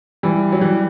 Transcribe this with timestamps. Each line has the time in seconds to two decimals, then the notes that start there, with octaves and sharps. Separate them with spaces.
0.23 E3 G3
0.52 F#3
0.61 E3 G3